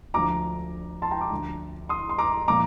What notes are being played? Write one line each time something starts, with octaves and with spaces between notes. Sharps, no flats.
D2 D3 F3 A#5 D6
A5 C6
G5 A#5
A#5 D6
D2 D3 F3
C6 D#6
C6
A#5 D6
A#2 F3 A#5 D6